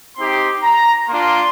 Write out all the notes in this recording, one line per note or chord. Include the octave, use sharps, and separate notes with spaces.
C4 D#4 G4 C6
A#5
A#3 D4 F4 C6